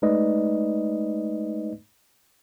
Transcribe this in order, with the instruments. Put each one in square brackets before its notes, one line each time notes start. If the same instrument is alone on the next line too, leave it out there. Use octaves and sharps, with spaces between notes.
[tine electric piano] G#3 A3 D#4 B4 D5 D#5